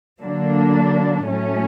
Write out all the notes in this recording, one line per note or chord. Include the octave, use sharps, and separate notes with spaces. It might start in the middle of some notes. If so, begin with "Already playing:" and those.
D3 F#3 A#3 D4
A2 F#3 A3 C#4